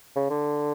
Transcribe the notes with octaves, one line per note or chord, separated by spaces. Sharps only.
C#3
D3